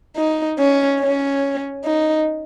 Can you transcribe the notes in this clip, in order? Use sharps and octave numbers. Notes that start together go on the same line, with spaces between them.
D#4
C#4
C#4
D#4